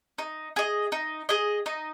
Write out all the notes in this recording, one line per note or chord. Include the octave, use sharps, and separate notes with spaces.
D#4
G#4 D#5
D#4
G#4 D#5
D#4